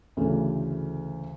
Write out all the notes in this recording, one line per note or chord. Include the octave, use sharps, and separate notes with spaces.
D2 C#3 E3 A3